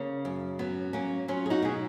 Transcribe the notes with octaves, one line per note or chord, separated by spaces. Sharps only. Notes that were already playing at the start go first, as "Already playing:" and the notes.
Already playing: C#3 A#3
F#2
F#3 B3
F#3 A#3 C#4
F#3 C#4 F4
G#4
D#4 F#4
B2 G#4